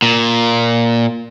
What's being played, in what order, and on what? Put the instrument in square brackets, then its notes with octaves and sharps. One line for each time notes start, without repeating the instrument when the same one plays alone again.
[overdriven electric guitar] A#2